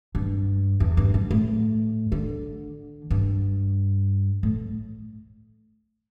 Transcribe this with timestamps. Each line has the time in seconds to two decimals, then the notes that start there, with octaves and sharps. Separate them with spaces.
0.15 G2
0.80 E2
0.97 G2
1.14 G2
1.31 A2
2.12 D3
3.11 G2
4.43 A2